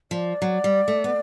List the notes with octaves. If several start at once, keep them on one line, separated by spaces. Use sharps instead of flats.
F3 D5
F#3
G3
A3
B3